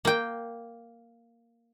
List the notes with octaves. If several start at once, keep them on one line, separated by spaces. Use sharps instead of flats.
A#3 G5